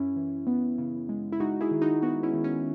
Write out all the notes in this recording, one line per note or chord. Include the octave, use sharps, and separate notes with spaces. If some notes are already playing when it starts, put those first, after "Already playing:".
Already playing: F#2 C#4 E4
E3
B3
C#3
G#3
E4
G#3 D#4 F#4
E4 G#4
D#3
D#4 F#4
B3 D#4 F#4
C#4 E4
D#3
C#4